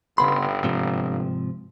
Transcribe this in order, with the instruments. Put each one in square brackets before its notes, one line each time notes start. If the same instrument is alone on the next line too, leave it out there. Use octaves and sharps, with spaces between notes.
[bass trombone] G1 [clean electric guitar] C#3 B3 C6 [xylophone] B5
[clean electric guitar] G#2 C3 F3